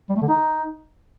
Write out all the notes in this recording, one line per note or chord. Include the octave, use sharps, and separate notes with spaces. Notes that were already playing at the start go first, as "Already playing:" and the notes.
G3
A3
D3
D#4